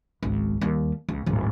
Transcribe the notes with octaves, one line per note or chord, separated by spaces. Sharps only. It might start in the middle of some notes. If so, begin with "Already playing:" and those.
G#1 C#2
D#2 G3
C#2
D1 G#1